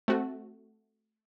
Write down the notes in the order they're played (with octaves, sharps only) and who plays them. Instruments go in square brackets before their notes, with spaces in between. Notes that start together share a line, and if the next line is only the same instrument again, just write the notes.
[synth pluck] A3 C4 F#4